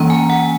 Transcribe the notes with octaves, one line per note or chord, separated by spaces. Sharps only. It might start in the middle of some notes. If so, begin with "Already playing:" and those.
Already playing: E3 A#3 C#4 A#5
G#5
F#5